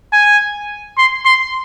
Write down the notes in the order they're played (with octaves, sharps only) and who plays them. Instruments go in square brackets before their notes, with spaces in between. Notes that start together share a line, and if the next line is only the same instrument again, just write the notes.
[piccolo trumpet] G#5
C6
C6